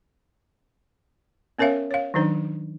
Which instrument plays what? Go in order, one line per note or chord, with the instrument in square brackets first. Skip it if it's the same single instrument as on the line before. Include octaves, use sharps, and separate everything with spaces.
[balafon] B3 C#4 A#4 C#5 E5 F5
C#5 F5
D#3 F#3 D4 D#4 C5